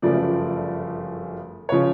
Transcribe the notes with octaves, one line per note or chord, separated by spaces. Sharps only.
G1 F#2 C#3 F3 A3 D5
C#3 F3 C#5